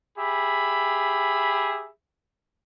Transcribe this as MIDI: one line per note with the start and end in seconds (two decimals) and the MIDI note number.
0.18 1.89 67
0.18 1.89 68
0.18 1.89 76
0.18 1.89 83